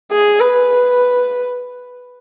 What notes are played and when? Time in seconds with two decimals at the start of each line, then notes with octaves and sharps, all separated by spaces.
0.11 G#4
0.41 B4